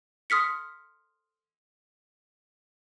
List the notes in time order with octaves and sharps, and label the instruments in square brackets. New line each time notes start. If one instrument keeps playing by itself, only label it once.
[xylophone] C6 D#6 F6 B6 C#7